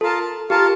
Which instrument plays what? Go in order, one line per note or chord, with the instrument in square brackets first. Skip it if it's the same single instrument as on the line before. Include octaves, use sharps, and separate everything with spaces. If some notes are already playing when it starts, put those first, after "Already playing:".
[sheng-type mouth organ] F4 A#4 F5 A5 [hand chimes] A4
[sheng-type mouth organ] F4 A#4 F5 A5 [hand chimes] G4